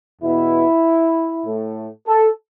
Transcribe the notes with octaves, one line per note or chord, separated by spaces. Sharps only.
E2 B2 B3 E4
A2 A3
A4